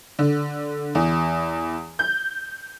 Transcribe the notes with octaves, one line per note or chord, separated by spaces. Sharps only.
D3
E2
G6